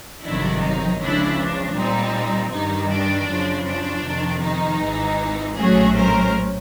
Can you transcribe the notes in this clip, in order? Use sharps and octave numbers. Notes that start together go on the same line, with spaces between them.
G1 F2 C3 D#3 F#3 D4 E4
D#4
C#2 C#3 F3 D4 E4
D4
A#2 G3 C4 D#4
G2 D#3 G3 D#4
D4
F#2 C#3 F3
D4
F2 C3 D#3
D#4
G#1 G#2 E3 G#3
A#1 A2 F#3 A3 C#4 F#4 G#4
A#4 C5